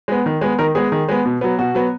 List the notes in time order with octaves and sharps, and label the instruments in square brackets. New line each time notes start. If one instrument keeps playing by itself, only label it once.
[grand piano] G#3 B3
D#3
G#3 B3
D#3 A#4
G#3 B3 G#4
D#3
G#3 B3
B2
F#3 B3
B2 F#4
F#3 B3